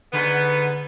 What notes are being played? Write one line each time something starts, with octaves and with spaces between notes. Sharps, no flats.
G#2 D3 B3